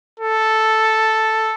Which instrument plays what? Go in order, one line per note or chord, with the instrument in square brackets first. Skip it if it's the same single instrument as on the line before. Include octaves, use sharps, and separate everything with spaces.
[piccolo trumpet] A4